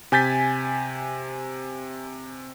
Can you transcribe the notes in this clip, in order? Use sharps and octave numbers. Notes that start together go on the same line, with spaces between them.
C3 G#5 G6 A6 B6